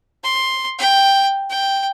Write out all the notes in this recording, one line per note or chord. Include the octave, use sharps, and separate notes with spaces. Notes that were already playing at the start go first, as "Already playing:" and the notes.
C6
G5
G5